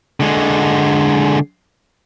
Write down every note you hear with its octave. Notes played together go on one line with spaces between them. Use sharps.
D3 G#3